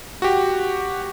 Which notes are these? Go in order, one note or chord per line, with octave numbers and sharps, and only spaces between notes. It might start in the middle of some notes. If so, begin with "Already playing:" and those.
F#4 G4